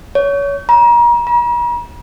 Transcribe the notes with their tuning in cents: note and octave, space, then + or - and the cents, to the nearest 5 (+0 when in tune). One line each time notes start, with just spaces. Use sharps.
C#5 +25
A#5 +35
A#5 +45